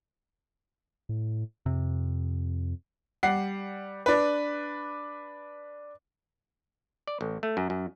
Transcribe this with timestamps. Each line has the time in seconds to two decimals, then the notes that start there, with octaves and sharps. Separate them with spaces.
1.09 A2
1.66 F2 C3
3.23 G3 F#5 C7
4.06 D4 B4
7.08 D5
7.21 A1
7.43 A3
7.57 F#2
7.70 F#2